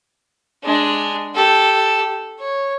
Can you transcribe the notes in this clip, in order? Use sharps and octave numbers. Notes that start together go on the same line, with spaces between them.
G#3 D4
G4 A4
C#5